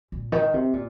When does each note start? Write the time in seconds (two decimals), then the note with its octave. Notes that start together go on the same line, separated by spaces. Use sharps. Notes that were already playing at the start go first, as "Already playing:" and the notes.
0.12 A#2
0.32 D#3
0.54 C3
0.73 A#2